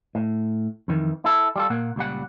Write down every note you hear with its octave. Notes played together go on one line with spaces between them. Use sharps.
A2
F2 D#3 E3
E4 A4
G3 F4 A4
A#2 A#3 F#5
C#2 A#2 G3 F#5